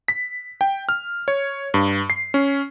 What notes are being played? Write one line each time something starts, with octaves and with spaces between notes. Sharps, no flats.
B6
G5
F6
C#5
G2
C7
C#4